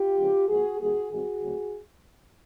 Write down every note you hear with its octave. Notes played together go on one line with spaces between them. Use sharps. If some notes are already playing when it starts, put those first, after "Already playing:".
Already playing: F4 G4
C#3 F3 G#3 B3 D4
G#2 F3 A#3 F#4 G#4
D#2 D#3 G3 A#3 F#4 G#4
G#2 D#3 G3 C4 F#4 G#4
D2 C#3 F#3 A3 C4